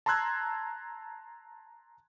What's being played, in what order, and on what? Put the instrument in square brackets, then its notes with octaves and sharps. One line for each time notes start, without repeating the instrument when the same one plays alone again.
[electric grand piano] A5 A#5 C6 E6 F#6 G#6